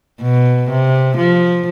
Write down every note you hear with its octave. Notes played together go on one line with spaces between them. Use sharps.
B2
C3
F3